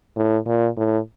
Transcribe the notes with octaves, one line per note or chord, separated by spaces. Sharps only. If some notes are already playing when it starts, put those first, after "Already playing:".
A2
A#2
A2